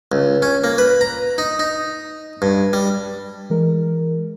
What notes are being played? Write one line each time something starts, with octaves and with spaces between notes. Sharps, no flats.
C#2
C#4
A#3
B4
A#5
D#4
D#4
G2
G3
E3 G#3 A#4